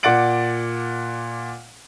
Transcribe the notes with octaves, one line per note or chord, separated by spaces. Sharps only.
A#2 D5 F#5 A6 D7 F#7